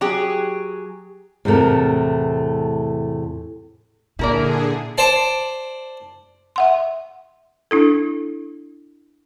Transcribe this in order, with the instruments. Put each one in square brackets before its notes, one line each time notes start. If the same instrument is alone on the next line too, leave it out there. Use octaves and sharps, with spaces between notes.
[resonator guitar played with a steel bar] F#3 G4 G#4
[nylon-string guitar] E2 A2 C3 A3 A#4
[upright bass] A#2 [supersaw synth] D3 G#4 [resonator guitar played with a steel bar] E4 A#4 D5
[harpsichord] C5 D5 A5
[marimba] E5 F#5 C6
D4 E4 A4